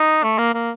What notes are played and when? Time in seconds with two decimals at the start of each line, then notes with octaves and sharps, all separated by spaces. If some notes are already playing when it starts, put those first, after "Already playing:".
Already playing: D#4
0.23 A3
0.38 A#3
0.54 A#3